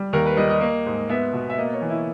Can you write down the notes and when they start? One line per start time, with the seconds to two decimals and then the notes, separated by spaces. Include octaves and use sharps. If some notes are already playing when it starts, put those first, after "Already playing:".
Already playing: G3
0.13 D#2 A#4
0.26 B4
0.37 G3 D#5
0.50 D#5
0.61 A#3
0.86 G#2
1.09 B3 E5
1.33 B2
1.50 E5
1.58 A#3 D#5
1.74 C#5
1.82 E3
1.90 E4